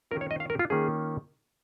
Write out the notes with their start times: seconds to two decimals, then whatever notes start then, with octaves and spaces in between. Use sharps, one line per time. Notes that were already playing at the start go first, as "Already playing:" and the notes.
0.11 D#3 C#4 F4 A#4
0.21 C#5
0.31 D#5
0.40 F5
0.50 A#4
0.59 F4
0.70 D#3 A#3 C#4 F4 G#4